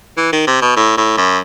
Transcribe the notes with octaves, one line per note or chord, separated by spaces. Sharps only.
E3
D#3
C3
B2
A2
A2
F#2